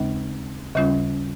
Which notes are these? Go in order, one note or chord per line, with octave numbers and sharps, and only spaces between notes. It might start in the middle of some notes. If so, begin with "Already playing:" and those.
Already playing: D#2 C#3 G#3 C4 D#4
D#2 C#3 G3 C#4 F4